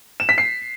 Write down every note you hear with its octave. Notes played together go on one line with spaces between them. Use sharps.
E7
B6
C7